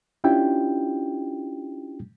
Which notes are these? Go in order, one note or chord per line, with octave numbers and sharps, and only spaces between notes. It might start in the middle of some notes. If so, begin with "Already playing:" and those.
C#4 D4 E4 F4 G4 G5